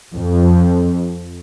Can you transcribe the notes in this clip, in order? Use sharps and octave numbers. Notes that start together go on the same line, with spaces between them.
F2